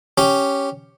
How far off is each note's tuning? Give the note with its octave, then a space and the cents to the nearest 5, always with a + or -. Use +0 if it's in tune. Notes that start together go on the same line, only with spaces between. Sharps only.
C#4 +0 G4 +0